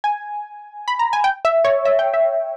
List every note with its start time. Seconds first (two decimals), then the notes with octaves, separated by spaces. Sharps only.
0.04 G#5
0.88 B5
0.99 A#5
1.13 G#5
1.24 G5
1.45 E5
1.65 C#5
1.85 E5
1.99 G5
2.14 E5